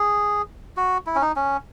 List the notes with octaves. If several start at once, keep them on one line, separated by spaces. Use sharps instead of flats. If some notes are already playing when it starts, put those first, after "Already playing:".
Already playing: G#4
F#4
E4
C#4
D#4
C#4